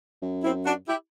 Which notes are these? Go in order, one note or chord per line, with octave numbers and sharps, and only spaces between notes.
F#2
C4 E4
D4 F#4
E4 G4